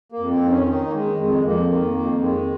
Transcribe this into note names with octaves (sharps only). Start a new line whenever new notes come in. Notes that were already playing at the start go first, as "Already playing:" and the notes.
A#3
F2
C4
D#3
C#4
D#3 D#4
A#3
D#3 G#3
F2 G#3
F2 A#3
D#3 A#3
F2 A#3
D#3 G#3